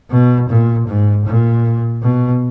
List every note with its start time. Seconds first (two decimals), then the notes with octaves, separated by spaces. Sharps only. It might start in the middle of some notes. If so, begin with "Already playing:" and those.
0.11 B2
0.49 A#2
0.88 G#2
1.26 A#2
2.03 B2